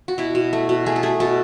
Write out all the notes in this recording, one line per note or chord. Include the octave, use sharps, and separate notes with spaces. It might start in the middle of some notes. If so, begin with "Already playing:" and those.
F#4
B2 E4
B2
A3
B2
A3 G#4
A4
A3 G#4
B2 A4